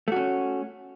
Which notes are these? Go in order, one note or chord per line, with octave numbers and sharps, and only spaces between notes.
A3 C#4 F#4